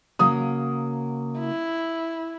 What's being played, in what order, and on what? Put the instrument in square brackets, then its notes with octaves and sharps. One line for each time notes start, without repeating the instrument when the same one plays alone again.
[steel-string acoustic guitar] C#3 F#3 A#3 [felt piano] D#6
[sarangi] E4